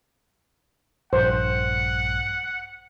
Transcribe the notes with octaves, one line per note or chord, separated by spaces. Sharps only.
A#1 G2 C5 F#5